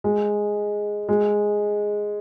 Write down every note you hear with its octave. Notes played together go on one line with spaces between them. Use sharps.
G#3
G#3